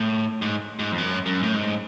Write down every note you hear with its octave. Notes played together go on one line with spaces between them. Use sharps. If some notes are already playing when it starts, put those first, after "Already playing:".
Already playing: A2
G#2
G#2
F2
F#2
F#2
A2
G#2